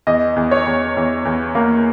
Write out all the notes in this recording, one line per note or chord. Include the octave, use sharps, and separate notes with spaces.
E2 D#5
E2
C#5
E2
E2
E2
A#3